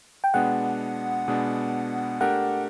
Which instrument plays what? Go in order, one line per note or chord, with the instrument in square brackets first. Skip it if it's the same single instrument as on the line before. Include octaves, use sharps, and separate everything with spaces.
[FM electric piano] G5
[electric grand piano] B2 G#3 B3 D4 [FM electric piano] F#5
[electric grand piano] B2 G#3 B3 D4
[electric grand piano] A3 D4 G4 A#4 [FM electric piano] F#5